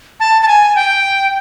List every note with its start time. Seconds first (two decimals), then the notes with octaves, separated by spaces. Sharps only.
0.20 A5
0.42 A5
0.48 G#5
0.76 G5